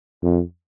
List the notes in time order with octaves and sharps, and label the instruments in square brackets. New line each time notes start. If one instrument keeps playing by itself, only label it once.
[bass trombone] F2